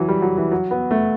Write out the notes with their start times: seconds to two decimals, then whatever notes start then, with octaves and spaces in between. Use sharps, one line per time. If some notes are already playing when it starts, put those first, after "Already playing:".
Already playing: E3 F#3
0.09 G3
0.22 F#3
0.37 E3
0.51 F#3
0.71 B3
0.91 A3